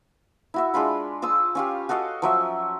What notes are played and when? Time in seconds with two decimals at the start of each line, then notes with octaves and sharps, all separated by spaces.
0.54 E4 F#4 E5
0.74 G#3 D4 F4 B5
1.22 F4 A5 D#6 E6
1.55 C#4 F4 G4
1.89 F#4 A4 D#5 F5
2.22 F3 F#3 E5